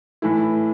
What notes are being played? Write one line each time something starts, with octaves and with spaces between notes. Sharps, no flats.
A2 E3 A3 E4